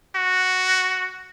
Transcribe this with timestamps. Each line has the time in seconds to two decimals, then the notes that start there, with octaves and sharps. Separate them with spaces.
0.16 F#4